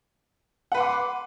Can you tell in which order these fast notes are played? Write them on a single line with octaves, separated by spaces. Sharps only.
F#5 B4 C6 D6